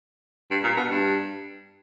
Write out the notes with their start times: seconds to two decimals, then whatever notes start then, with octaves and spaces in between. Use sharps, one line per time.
0.51 G2
0.64 A#2
0.77 B2
0.90 G2